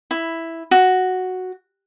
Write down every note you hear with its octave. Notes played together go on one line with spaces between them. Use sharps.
E4
F#4